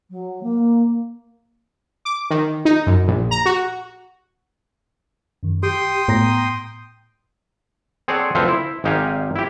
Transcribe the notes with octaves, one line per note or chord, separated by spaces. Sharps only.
F#3
A#3
D6
D#3
D#4
F#2
A#1
A#5
F#4
F#2 D#3
G4 G5 C6 D#6
A2 B3 A#5 A#6
C4 G#4 A4 C#5 D5 F#5
D2 F3 C4 A4 B4 F5
E4
G#1 G#2 D#4 G4 F5 G#5
E4 G4